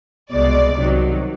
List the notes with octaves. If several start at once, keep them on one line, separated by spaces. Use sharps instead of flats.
C2 B2 G#3 D5
C2 C3 D#3 F#3